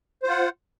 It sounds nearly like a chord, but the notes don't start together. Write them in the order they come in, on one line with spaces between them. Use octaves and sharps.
C5 F4 F#5